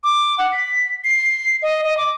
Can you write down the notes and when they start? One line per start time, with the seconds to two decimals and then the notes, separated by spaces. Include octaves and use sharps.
0.04 D6
0.38 F#5
0.52 B6
1.04 C7
1.62 D#5
1.84 D#5
1.97 D6